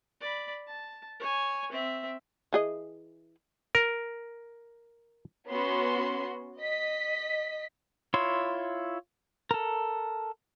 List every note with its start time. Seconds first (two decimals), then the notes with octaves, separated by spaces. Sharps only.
0.21 D5 B5
0.67 A5
1.19 C#5 G#5
1.72 C4 E5
2.53 E3 G#4 D#5
3.75 A#4
5.48 B3 C#4 F#4 C6
6.58 D#5 B6
8.14 E4 F4 C#5 C6
9.51 A4 A#4